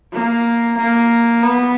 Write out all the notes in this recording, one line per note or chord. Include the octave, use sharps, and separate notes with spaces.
A#3
A#3
B3